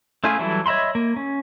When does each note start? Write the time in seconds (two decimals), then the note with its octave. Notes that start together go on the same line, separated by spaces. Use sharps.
0.24 A3 C#4 E4 F4 G#4
0.39 E3 F#3 G3 E4 A4
0.66 C#5 D#5 E5 B5 C6
0.95 A#3
1.16 C#4